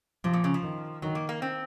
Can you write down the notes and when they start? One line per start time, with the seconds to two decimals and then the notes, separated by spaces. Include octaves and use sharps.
0.24 C3 F3
0.33 A#2
0.44 C#3
0.54 F3
0.63 D#3
1.02 D#3 F#3
1.15 A#3
1.29 A#3
1.42 C4